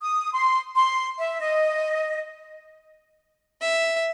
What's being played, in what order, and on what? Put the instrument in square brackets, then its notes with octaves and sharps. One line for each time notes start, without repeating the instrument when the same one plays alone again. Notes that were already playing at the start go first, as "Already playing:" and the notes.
[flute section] D#6
C6
C6
E5
D#5
[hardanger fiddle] E5